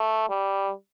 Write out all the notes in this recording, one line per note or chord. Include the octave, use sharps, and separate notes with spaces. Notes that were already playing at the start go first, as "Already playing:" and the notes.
Already playing: A3
G3